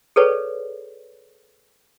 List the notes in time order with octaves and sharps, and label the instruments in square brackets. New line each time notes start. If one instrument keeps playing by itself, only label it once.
[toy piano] G#4 A4 B4 C#5 D5